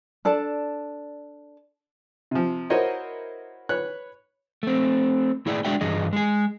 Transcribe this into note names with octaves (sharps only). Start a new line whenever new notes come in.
D4 A4 D5 A5
C3 F3
E4 F#4 A#4 C5 C#5 D#5
B4 C#5 F#6
A3 C4
A2 E4 G#4 D5 F5 G5
G#3 D4 F#4 D5 E5 G5
G2 E3 G#4 D#5
G#3 G#4